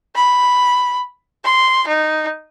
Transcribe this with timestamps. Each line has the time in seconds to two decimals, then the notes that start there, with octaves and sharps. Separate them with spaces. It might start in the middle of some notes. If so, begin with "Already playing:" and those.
0.16 B5
1.45 C6
1.88 D#4